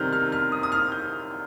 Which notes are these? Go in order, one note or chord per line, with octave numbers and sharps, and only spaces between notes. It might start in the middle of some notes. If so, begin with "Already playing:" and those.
Already playing: C3 D#3 G3 F6 G6
F6
F6
D#6
D#6
F6
G6